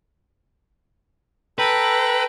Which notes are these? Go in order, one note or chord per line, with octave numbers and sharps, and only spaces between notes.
A4 B4 G5 A#5